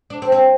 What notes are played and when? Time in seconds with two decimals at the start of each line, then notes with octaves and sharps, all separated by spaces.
0.10 D4
0.22 C4
0.32 C4